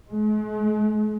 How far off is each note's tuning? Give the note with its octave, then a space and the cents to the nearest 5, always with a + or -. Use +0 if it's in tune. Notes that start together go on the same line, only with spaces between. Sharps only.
G#3 +45